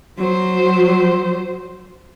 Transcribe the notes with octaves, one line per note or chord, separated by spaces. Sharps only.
F#3 C5